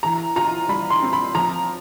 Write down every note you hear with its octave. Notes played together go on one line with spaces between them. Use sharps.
E3 A#5
F4 A#5
G3 B5
C6
C4
B5
F3 A#5